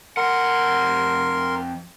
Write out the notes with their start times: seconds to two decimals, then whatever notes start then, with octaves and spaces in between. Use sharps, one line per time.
0.17 F2 A#4 F#5 C6